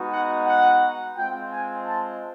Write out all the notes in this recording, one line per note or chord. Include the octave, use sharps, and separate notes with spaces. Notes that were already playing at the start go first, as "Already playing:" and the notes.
Already playing: G#3 B3 D#4 F#4
F#5
F#5
G#3 C4 F4 G5
G#5
A5